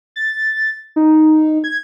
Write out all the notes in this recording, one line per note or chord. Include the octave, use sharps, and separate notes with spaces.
A6
D#4
G#6